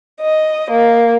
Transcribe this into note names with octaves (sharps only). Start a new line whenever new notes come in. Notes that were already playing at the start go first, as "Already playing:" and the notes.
D#5
A#3